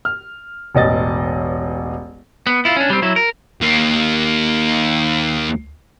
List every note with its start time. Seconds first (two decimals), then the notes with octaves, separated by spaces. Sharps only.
0.05 F6
0.74 E1 A1 D#5 A6
2.47 B3
2.65 E4 F4
2.76 C#4 D4
2.90 G3 C4
3.02 F#3 E4
3.16 A#4
3.61 D#2 A#3